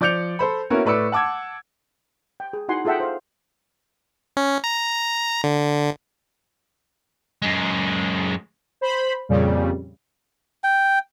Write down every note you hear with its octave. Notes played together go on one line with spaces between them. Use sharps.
F3 D5 D6 G6 C#7 F7
A4 C5 B5
A#3 B3 C#4 E4 F#4 A#4
A2 A3 B4 D5 E6 C#7
F#5 A5 D6 E6 G#6
G5
G#4
D#4 E4 F#4 F#5 G#5 C6
F4 G#4 A4 E5 F#5 G5
C5 F5
C#4
A#5
D3
F#2 G#3
C5 B5
F2 A#2 C#3 G3
G5